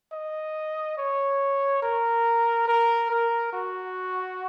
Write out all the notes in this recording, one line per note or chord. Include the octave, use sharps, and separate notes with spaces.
D#5
C#5
A#4
A#4
A#4
F#4